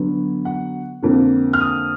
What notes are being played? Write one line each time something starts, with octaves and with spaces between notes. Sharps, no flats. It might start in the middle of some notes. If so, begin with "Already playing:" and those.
Already playing: D3 F#3 B3
F#5
F2 D3 F3 A#3
F6
D#6